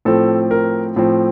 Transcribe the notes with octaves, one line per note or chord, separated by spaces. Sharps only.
A2 F3 C4 A4
A#4
A2 F3 C4